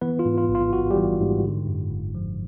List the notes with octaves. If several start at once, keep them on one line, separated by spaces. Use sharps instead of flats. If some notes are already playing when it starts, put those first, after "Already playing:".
E3 B3 B4
F4
G#2
F4
A1
F4
A1 F#4
G3 G4
E3
G#2
D3
F#2
G1
F3